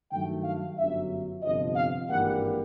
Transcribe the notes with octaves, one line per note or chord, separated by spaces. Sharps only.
G2 D#3 F#3 A3 G5
F5
G1 F#2 D3 F#3 E5
G1 F2 C3 F3 D#5
F5
G#1 G2 E3 G3 A#3 F#5